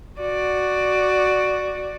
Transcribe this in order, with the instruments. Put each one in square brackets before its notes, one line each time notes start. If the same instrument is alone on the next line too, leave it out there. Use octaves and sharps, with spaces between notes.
[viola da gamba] F#4 D5